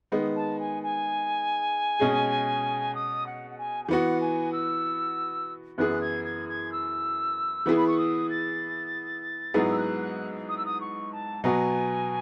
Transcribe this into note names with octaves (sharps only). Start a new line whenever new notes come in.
D#3 G#3 B3
A5
G#5
G#5
B2 G#3 C#4 G#4
D#6
F#5
F#5
G#5
G#5
E3 B3 F#4 F#5
G#5
E6
F#2 E3 B3 E4 G#4 F#6
G#6
G#6
G#6
E6
E3 B3 E4 G#4
B5
C#6
D#6
A6
G#2 F#3 B3 E4 G#4
E6
F#6
F#6
D#6
E6
D#6
C#6
A5
B2 F#3 B3 F#4 G#5